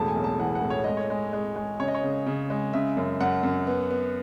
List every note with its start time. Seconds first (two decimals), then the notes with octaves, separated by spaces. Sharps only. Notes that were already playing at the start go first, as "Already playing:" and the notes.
Already playing: E1 A2 A5
0.08 G#5
0.16 B1
0.24 A5
0.40 E3 F#5
0.55 F#5
0.62 A2
0.70 C#5
0.84 G#3 D#5
0.97 C#5
1.10 G#3
1.33 G#3
1.56 G#3
1.79 C#3 C#5
1.88 D#5
1.95 C#5
2.03 C#3
2.27 C#3
2.50 G#3
2.73 C#3 E5
2.97 F#2
3.20 F#2 F#5
3.43 F#2
3.67 B3
3.91 B3